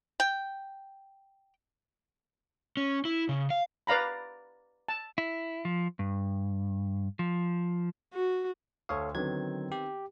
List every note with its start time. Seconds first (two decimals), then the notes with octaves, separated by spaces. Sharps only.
0.20 G5
2.77 C#4
3.05 E4
3.29 C#3
3.50 F5
3.87 B4 D5 F5 A#5 B5
4.88 A5
5.18 E4
5.65 F3
5.99 G2
7.19 F3
8.14 F#4
8.89 D2 A4 C#5 F5 C#6 D#6
9.15 D3 D#3 F#3 B3 C4 G#6
9.72 G4